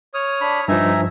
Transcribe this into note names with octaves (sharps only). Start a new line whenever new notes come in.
C#5 D#6 F6
D4 B5
G2 F3 D#4 E5 G#5 A#5